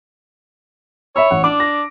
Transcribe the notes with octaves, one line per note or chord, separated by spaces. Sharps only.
C#5 E5 B5 E6
A1 F#5
D4 D6
A#6